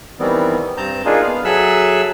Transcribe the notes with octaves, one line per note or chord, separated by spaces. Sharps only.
D#3 E3 G3 B3 C4
G2 C4 A5 A#5 G6
A#3 D4 D#4 F4 G#4
B3 F5
F#3 G#4 A4 E5 E6 F#6